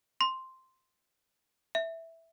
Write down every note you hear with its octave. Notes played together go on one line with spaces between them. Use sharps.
C6
E5